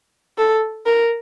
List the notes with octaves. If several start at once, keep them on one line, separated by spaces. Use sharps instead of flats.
A4
A#4